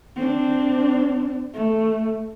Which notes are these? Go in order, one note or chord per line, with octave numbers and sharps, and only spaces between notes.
C4 D4
A3